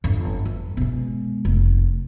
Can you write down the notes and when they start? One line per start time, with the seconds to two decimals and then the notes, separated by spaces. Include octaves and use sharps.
0.04 G1 F2
0.45 F2
0.77 B2 G#3
1.45 F1